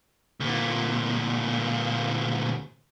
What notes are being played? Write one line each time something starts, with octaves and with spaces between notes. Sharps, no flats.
D2 A#2